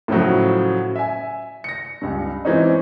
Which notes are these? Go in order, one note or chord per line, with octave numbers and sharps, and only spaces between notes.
A2 C#3 F3 F#3
E5 G#5
A#6 C#7
C#2 G2
E3 G#3 C4 C#4 D#4